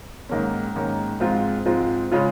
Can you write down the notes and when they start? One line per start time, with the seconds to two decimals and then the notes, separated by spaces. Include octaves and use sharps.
0.29 G#2 D#3 A#3 C#4
0.75 G#2 D#3 A#3 C#4
1.20 G#2 F3 G#3 C4 F4
1.66 G#2 F3 G#3 C4 F4
2.12 C#3 G#3 C#4 F4